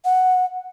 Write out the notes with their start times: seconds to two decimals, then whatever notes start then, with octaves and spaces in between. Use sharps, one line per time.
0.05 F#5